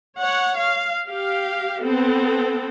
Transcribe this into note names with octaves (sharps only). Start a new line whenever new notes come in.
C#5 F#5
F5
G4 F5
B3 C4 A4